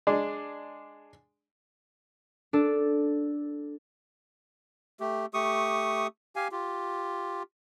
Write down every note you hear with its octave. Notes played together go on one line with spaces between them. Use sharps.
G#3 D4
D4 A4
A3 G4
A3 G4 C#6 D#6
G4 F5 G#5
F4 G4